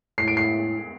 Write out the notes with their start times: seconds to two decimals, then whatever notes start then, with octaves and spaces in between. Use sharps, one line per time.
0.18 A2 C7
0.28 D7
0.37 C7